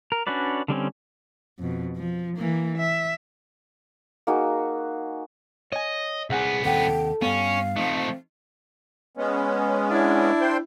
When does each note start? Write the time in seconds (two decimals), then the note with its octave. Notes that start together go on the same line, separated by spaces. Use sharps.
0.12 A#4
0.27 C#4 D4 F#4 B4 D5
0.68 D3 G3 C4 C#4
1.59 F2 B2
1.97 F3
2.37 E3 A#3
2.78 E5
4.27 A#3 D#4 F#4 G#4
5.72 C#5 D#5 G#5
6.30 C2 B3 G#4 E5 F#5 G#5
6.65 D#2 C3 A4 F#5 G5
7.22 G2 B3 C#4 F5
7.76 F3 A3 C4 D#4
9.17 G#3 B3 C#4
9.90 D4 E4
10.41 C5 G5 C6